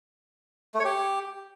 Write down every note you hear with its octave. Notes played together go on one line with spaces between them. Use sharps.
A3
C#5
G4